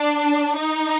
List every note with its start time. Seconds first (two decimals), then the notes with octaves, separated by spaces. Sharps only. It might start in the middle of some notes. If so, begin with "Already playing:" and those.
Already playing: D4
0.57 D#4